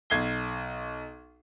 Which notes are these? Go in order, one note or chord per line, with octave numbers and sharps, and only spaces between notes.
B1 G#6 C7 G7